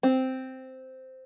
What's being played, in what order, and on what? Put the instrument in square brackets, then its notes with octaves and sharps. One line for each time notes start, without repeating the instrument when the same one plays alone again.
[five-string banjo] C4